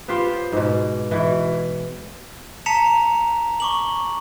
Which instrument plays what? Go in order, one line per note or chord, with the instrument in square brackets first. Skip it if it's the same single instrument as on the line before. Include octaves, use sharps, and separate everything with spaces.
[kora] B3 F4 G4 C5
G#2 B2
B2 E3
[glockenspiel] A5 A#5 B6 C#7 E7 F7
C#6 D6 F#7